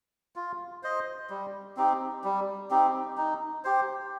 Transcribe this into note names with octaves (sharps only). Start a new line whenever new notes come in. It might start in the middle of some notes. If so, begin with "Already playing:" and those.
F4
C5 D#5
G3
C4 D#4 G4
G3
C4 D#4 G4
D#4
G4 C5